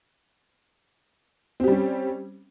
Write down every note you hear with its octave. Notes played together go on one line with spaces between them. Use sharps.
G3 C4 C#4 G4